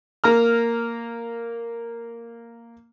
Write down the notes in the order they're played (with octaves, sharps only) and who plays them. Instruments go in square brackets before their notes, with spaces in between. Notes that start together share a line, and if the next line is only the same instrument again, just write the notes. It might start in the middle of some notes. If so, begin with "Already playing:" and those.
[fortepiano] A#3 A#5 F6